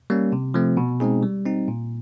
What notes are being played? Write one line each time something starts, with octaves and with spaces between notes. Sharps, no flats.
G3 A#3 C#4
C3
F3 A3 C4
B2
G#3 C4 D#4 G#4
G3
C4 D#4
A#2